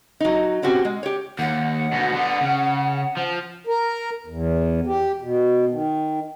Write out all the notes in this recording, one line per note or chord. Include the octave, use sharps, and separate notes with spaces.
F#3 D#4
B2 C4 C#4 F#4 G4
G#3
G4 C#5
D#2 F#5
D2 B2
D3 B3
C#3
F3
A#4
E2
G4
B2
D#3